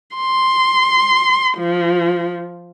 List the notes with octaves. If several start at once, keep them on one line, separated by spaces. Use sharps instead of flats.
C6
F3